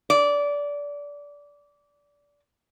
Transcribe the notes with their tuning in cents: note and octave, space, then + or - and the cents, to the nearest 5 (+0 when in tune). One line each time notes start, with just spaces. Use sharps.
D5 -20